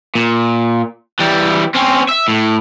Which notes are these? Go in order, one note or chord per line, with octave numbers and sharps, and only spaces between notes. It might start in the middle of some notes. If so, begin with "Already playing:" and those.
A#2
E3 G3
C4 C#4
E5
A2